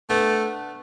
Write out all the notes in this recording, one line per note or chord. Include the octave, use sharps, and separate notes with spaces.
A3 B3 D4